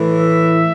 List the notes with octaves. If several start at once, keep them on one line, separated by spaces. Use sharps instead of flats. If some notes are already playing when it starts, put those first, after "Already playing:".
Already playing: A2 E3
E5